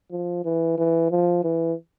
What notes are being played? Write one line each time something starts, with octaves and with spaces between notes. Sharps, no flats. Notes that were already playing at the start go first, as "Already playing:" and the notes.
F3
E3
E3
F3
E3